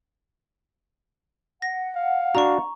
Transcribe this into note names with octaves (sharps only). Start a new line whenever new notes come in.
F#5 A#6
F5
D4 F#4 A#5 C#6